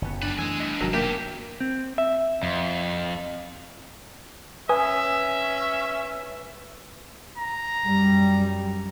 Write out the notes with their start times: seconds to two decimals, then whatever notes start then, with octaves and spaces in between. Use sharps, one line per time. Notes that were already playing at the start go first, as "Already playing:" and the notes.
0.02 F#1 F#2 A2 B3 C#4
0.22 G#2 D4 B4
0.38 E3 A3 D#5 G#5 E6 G#6
0.60 G2 D#5
0.81 F1 G#2 D#3 F#3 A#4
0.94 B2 A#3 G4 G5 A5 G6 B6
1.61 C4
1.98 E5
2.43 F2
4.69 C#4 B4 E5 G#5 D#6
7.38 A#5
7.83 F#2 G3